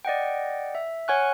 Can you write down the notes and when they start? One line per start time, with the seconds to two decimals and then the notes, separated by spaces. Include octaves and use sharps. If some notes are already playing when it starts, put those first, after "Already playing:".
0.05 D5 D#5 F#5 G5
0.75 E5
1.08 C#5 F#5 G#5 C#6 F6 F#6